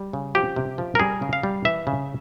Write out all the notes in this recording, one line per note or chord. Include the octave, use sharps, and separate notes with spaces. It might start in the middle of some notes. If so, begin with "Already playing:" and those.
Already playing: G3
C#3
F3 G4
C3
F3
A#4
G3 G#4
C#3
F5
G3
E3 E5
C#3